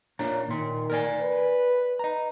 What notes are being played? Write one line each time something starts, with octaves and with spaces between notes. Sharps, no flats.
A#2 D4 C#5 A#5
A#2 D#3 C6
A#4 D5 G#5
B4
D#5 A#5